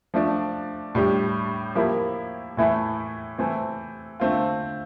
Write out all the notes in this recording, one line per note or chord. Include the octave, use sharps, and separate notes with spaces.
F3 A3 D4
A2 G3 D4 G4
F3 A#3 E4 G4
A2 E3 A3 E4
E3 A3 C4
D3 A3 C4 F4